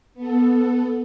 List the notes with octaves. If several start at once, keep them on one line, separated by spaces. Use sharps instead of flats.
B3 A4